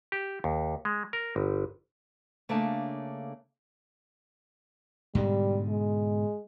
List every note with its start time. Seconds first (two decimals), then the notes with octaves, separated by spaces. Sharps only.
0.12 G4
0.44 D#2
0.85 G#3
1.13 A#4
1.36 G1
2.49 C#3 A3 A#3 D4 F5 A5
5.15 G#2 B2 D3 G3
5.69 G#3